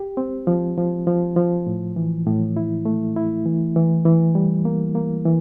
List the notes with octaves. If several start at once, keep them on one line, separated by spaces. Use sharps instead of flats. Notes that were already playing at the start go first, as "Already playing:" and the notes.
Already playing: G4
C4
F3
F3
F3
F3
A2
E3
A2
E4
A3
E4
E3
E3
E3
G3
A#3
A#3
E3